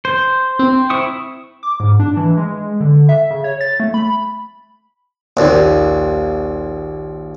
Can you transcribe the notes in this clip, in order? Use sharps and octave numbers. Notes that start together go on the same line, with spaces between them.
C5
C4
E4 C#6 D#6
D6
G#2
D4
E3
G#3
D3
E5
C#3
C#5
A6
A3
B5
A#1 D#2